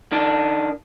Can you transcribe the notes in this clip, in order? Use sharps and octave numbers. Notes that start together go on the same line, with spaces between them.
D#3 D4